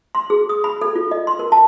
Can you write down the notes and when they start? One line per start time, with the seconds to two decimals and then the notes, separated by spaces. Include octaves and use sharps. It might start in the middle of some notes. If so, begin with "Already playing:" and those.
0.15 C6
0.30 G#4
0.49 D#6
0.64 B5
0.82 A4
0.95 F4
1.11 D#5
1.27 C6
1.39 A#4
1.52 A5